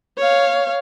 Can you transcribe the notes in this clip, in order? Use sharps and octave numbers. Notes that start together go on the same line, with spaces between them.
C#5 F5